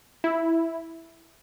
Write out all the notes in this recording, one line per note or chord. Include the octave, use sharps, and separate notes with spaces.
E4